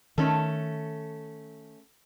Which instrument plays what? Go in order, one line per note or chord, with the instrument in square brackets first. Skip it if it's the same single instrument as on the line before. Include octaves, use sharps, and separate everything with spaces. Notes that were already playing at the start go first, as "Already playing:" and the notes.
[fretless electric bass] D#3 [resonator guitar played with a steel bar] A3 C#4 A4